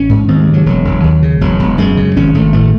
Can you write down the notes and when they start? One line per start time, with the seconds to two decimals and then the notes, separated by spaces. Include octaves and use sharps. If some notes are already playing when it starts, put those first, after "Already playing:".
Already playing: A1 C#4
0.09 G#2
0.28 D#2 C4
0.42 G#3
0.47 C#3
0.54 F#3
0.66 E1 F#3
0.85 E1
1.04 D#2
1.23 C#3
1.41 E1 F#3
1.60 E1
1.78 F#2 G#3
1.97 C#3
2.16 G#1 C#4
2.34 G#1 A3
2.53 A2 A3